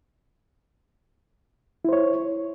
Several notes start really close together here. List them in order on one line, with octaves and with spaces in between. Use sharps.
E4 C5 C#5